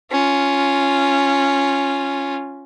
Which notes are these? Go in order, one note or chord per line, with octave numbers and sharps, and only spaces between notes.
C#4 F4